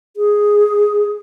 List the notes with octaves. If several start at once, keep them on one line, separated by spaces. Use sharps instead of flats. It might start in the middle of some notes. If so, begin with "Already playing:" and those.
G#4